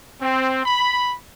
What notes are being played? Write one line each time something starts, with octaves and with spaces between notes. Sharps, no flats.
C4
B5